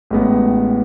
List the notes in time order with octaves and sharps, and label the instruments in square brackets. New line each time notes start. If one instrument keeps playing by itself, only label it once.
[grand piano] A1 A2 G#3 B3